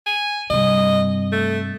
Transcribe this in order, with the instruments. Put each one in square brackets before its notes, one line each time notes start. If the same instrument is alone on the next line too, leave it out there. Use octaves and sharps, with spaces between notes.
[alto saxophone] G#5
[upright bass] G2 C3 [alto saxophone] D#5
[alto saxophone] A3